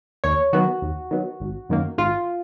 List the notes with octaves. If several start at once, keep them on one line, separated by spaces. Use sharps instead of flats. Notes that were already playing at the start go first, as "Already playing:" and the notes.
D#2 C#5
D#3 F#3 B3 F#4
D#2
D#3 F#3 B3
G#1
F#2 D#3 A#3
G#1 F4